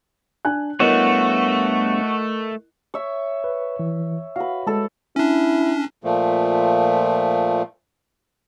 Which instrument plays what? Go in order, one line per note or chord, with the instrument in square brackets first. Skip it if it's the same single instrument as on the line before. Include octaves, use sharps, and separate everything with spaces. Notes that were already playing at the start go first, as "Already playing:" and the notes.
[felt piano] D4 G#5 F#6
[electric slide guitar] G2 B3 C#5 [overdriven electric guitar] A3 [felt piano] E4 A#4 D#5 [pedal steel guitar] F#4
[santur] C#5 E5
[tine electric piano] B4
E3
[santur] F#4 B4 [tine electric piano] F5
[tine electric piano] G#3 [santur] A4 A5
[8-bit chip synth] C#4 D4 [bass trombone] E4
[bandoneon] A#2 F3 A3